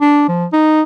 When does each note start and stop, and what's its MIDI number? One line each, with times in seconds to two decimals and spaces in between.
0.01 0.24 62
0.28 0.46 53
0.53 0.82 63